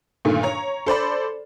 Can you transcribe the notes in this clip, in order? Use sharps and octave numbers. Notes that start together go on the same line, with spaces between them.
G2 A#2 D3 D#3 A3
C#5 A#5
A4 C5 D5 B5